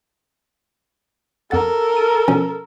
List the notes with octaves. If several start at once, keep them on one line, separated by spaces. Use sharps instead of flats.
F2 A4 A#4 F#5 A6
D#7
B2 F3 C#4